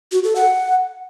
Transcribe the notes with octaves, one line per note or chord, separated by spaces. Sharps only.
F#4
A4
F#5